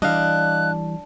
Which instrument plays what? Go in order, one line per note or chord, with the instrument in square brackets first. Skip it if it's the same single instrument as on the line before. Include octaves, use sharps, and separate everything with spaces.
[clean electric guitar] E3 G3 [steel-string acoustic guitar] D4 [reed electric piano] D#5 F5 [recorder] F#6